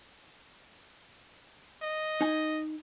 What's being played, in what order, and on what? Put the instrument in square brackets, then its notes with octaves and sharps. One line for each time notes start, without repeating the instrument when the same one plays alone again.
[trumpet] D#5
[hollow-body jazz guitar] D#4 G#5